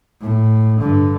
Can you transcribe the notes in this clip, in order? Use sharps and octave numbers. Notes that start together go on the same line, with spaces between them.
A2
G2 D3